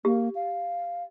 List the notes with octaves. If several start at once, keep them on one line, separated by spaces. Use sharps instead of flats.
A#3 G4
F5